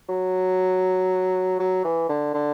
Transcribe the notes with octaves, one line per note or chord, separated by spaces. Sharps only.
F#3
F#3
E3
D3
D3